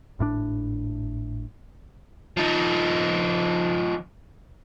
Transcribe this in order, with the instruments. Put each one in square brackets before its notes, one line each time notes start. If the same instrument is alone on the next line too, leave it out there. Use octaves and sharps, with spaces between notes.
[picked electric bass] G#1 A2 D#3 D4
[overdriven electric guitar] F3 D#4